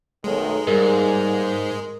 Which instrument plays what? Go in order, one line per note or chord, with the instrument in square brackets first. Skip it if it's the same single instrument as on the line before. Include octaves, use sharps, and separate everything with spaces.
[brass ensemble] B1 D#3 A3 [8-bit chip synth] G#3
[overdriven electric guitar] G#2 [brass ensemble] G3 A#3 G#4 [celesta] A#4